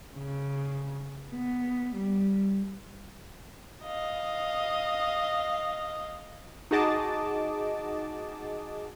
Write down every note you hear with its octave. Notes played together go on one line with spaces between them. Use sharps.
C#3
B3
G3
D#5 F5
D#4 F#4 G#4 D#5 A5 D6